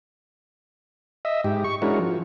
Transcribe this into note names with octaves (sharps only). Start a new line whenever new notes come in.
D#5 E5
G#2 G4
C#6
G#3 C#4 D4 E4 F#4 A#4
F3